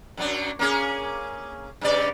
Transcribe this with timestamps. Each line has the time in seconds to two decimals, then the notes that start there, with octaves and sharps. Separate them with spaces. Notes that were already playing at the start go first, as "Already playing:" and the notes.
0.17 F#2 F#3 D4
0.59 A#3 C#4 G#4
1.81 G2 C#3 D5